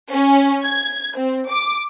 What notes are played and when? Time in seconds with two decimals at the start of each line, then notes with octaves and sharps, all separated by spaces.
0.12 C#4
0.65 G#6
1.16 C4
1.48 D6